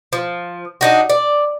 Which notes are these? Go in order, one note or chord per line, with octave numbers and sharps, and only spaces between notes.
F3
D4 D#4 F#4
D5